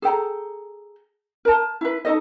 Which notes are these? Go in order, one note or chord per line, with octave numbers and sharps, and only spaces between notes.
G#4 A4 G5 A#5
A#4 A5
E4 B4
D#4 F#4 A4 D#5